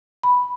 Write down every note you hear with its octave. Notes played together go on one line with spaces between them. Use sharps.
B5